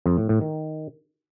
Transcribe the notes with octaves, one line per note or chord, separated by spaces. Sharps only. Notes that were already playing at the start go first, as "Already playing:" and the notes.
F2
A2
A2
D#3